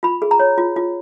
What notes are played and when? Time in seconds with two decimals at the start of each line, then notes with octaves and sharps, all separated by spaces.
0.03 F4 B5
0.22 G#4
0.31 A#5
0.39 C#5
0.58 F4
0.76 F4